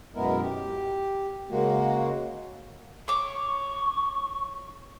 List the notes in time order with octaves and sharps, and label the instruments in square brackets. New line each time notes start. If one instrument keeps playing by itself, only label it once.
[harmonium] F#2 B2 G#3 B3 E4 A#4
G4
C#3 G#3 A#3 F#4
[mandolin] C#5 D6 [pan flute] C#6